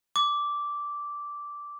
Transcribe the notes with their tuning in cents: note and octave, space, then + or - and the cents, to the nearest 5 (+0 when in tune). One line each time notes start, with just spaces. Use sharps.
D6 -10